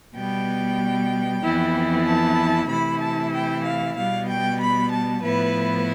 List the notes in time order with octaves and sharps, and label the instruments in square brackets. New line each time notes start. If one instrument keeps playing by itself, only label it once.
[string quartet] B2 G3 B3 G5
F2 E3 B3 E4
A5
C3 E3 A3 E4 B5
A5
G5
F5
B2 G3 B3 F5
G5
B5
A5
A2 F3 B3 E4 B4